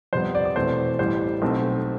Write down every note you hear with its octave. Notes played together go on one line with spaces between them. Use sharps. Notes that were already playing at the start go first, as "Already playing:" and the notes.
F2 C3 G3 B3 C5
D5
D5
E2 B2 A3 C4 C5
A1 A2 G3 C5
B1 B2 A3 C4